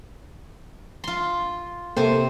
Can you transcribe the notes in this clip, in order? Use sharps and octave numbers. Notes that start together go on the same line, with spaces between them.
F4 C6
C3 A#3 A4 C5 G5